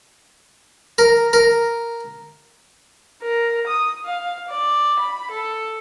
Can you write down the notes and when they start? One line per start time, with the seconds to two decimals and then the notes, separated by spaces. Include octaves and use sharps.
0.98 A#4
1.33 A#4
3.22 A#4
3.67 D#6
4.05 F5
4.49 D5
5.00 B5
5.31 A4